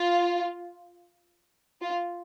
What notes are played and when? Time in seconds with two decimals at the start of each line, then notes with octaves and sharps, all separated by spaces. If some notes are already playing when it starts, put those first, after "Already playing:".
Already playing: F4
1.81 F4